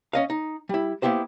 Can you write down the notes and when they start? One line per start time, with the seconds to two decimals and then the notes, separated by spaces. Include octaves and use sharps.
0.13 C#4 D#5 F5
0.30 D#4
0.69 G3 E4
1.02 A#3 B3 E4 G4 C5